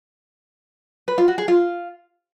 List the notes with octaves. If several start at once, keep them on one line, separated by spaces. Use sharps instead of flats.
B4
F4
F#4
G#4
F4